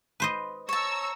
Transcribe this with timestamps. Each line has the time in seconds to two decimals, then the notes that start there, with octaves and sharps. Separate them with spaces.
0.20 B4 C5 D#5
0.69 C#5 A5 A#5 C#6 E6